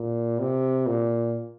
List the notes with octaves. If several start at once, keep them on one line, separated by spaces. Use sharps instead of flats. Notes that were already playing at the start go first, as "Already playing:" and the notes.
Already playing: A#2
C3
A#2